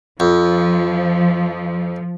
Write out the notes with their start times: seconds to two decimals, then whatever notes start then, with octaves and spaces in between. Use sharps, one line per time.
0.20 F2 F3